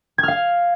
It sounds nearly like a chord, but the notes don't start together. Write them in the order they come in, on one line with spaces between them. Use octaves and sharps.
G#6 F6 F5